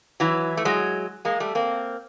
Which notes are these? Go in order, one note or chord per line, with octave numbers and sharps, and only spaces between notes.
E3 F#3
A3
F#3 G#3
G#3 A#3
G3 A3
A#3 C4